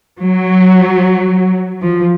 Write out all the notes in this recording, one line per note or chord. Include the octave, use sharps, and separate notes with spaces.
F#3
F3